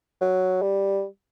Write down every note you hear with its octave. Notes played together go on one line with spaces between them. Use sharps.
F#3
G3